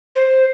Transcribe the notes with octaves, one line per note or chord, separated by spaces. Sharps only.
C5